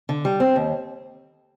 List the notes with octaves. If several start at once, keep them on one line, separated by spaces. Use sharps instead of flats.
D3
G3
C4
D#2